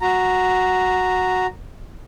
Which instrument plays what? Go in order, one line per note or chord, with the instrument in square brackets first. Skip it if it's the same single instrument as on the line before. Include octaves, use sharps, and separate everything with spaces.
[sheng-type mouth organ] F#4 A#5